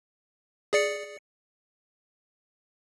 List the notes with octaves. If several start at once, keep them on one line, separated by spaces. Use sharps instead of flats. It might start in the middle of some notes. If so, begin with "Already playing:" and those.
G#4 D5 C#7